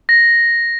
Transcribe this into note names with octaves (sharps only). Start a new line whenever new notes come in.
A#6